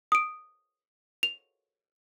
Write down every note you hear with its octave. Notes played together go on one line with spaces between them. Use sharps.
D#6 D7
F7